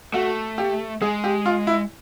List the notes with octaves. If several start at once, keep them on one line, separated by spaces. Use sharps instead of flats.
A3 F#4
G4
G#3 G#4
G4
F4
E4